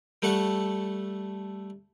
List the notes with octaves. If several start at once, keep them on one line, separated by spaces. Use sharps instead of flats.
G3 A3 A4 F#5 C#6